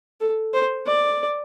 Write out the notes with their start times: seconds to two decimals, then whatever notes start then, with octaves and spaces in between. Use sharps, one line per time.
0.21 A4
0.54 C5
0.86 D5